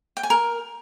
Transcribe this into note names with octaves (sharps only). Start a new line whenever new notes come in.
G5
G#5
A#4